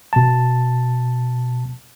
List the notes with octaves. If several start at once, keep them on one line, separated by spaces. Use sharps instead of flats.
B2 A5